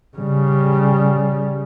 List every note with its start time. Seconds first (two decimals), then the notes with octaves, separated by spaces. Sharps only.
0.17 C#3 G3